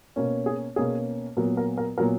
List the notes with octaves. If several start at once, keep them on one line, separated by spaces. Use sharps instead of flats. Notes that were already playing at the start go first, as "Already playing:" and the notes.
B2 A#3 C#4
G#4
B2 A#3 C#4 G#4
A#2 F#3 B3 A#4
A#4
A#4
A#2 F#3 B3 A#4